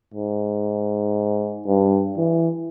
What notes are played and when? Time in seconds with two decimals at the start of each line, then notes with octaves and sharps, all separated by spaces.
0.14 G#2
1.66 G2
2.17 E3